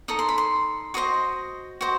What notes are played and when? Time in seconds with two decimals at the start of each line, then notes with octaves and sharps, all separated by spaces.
0.08 D#4 A4 D#6
0.19 C6
0.29 B5
0.38 C6
0.94 F#4 C5 D#5 D#6
1.81 F#4 C5 D#5